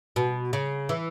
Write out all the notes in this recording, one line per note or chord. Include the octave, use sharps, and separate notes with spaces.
B2
C#3
E3